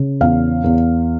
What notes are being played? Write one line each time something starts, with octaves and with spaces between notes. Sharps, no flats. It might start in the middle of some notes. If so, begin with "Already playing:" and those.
Already playing: C#3
E2 F5
E2